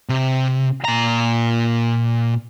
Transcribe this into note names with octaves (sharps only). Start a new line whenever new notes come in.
C3
A#2 A#5